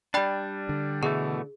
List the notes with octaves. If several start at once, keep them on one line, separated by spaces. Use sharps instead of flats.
G3 D4 D5 G5 B5
D3
B2 E3 A3 G#4